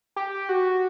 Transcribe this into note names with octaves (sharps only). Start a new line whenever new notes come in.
G4
F#4